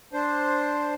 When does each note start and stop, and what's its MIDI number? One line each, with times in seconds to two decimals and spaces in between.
0.13 0.95 62
0.13 0.95 72